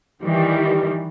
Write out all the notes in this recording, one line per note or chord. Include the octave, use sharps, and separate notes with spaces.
D#3 E3 G3